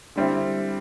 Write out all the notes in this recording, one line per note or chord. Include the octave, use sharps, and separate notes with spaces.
D3 G3 C4 E4